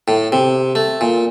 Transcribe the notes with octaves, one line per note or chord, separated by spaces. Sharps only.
A2
C3
A3
A#2